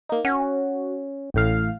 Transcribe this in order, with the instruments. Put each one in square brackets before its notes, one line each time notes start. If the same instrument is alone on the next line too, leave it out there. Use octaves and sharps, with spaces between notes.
[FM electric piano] A#3 D#4
[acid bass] C#4 [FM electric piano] F#4
[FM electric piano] A1 A2 F5